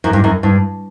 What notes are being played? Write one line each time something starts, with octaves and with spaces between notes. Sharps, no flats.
F#2
G2
F#2
G2